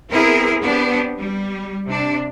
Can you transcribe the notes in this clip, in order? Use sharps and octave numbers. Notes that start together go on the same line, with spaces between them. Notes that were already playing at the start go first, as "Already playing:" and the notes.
B3 C4 E4 G#4 A#4
B3 C4 D4 G4
G3
C3 D4